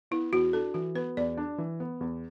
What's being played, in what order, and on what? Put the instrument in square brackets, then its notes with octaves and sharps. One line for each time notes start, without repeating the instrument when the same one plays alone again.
[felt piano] B3 [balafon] E4
[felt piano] E2 [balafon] F#4
[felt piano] D4 [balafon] A4
[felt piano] E3 [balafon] F#4
[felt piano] B3 [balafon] B4
[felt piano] E2 [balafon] D5
[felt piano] D4
E3
B3
E2